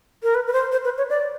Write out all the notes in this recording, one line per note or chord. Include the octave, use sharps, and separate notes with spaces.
A#4
B4
B4
C5
C5
B4
C#5
D5